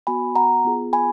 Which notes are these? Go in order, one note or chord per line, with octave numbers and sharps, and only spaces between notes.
B3 F#4 G#5 B5
F#5 A#5
B3 F4 G#4
G#5 B5